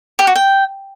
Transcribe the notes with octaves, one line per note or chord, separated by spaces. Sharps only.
G4
F#4
G5